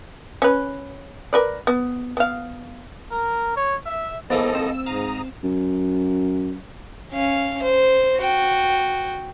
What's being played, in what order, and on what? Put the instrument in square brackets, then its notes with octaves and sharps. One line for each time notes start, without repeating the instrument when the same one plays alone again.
[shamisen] C#4 B4
A#4 B4 D5
B3
B3 F5
[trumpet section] A#4
C#5
E5
[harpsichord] G#2 E3 A#3 [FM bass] B3 [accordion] A4 D#5 [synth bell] C5 F5
[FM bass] C4 [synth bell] E7
[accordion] E6
[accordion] G#2 A#5 D#6 [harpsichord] F5
[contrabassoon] F#2
[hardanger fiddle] C#4 F5
C5
F#4 G5